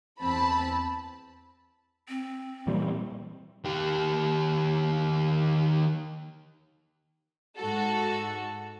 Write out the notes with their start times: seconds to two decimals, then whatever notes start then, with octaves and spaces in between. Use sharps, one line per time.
0.20 E2 C4 A5 B5
2.09 C4
2.67 A#2 E3 G3
3.65 D#3 G4
7.57 G#2 F#4 A4